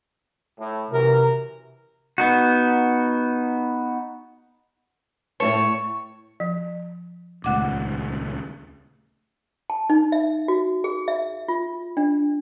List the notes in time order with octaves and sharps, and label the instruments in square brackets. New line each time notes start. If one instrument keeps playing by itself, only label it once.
[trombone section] A2
[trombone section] F#2 E3 A#4 [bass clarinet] C3
[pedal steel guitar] B3 D#4 F#4
[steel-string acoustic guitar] A2 A3 A5 [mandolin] C#5
[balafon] F3
[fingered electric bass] D#1 C#2 [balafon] A3 F#5 D6
[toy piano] A5
D#4
E5
F#4
G#4
E5
F4
D4